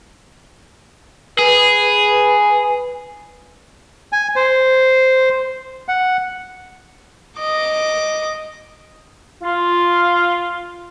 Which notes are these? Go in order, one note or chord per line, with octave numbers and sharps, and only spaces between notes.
G#4 B4
G#5
C5
F#5
D#5 D6
F4